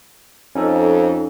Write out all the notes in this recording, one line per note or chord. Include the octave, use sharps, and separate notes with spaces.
F2 C#4 D#4 A4